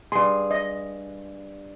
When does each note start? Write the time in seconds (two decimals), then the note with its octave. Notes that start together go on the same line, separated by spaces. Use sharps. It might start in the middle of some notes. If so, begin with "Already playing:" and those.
0.12 G2 G#4 C6
0.51 D#5